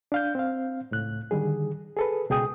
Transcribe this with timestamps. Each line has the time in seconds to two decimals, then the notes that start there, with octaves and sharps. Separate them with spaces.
0.12 D4 F5 G6
0.35 C4 F5
0.91 C#2 A2 F#6
1.31 D3 D#3 G3 G#4
1.97 G#4 A4 B4
2.29 C#2 B2 G#4 G5 D#6